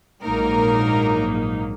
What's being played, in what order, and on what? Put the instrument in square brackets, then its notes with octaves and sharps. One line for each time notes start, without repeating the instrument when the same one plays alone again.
[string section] A#1 G#2 F#3 A#3 D#4 A#4